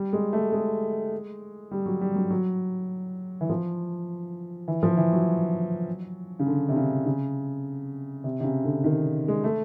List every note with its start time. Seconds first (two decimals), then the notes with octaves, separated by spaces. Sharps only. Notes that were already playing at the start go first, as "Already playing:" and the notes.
Already playing: G3
0.13 G#3
0.33 A3
0.52 G#3
1.71 G3
1.86 F#3
2.01 G3
2.16 F#3
2.31 F#3
3.41 E3
3.50 F3
4.68 E3
4.83 F3
4.97 E3
5.13 F#3
6.39 C#3
6.47 D3
6.69 C3
6.76 C#3
7.06 C#3
8.24 C3
8.40 C3
8.44 C#3
8.64 D3
8.84 D#3
9.28 G#3
9.44 A3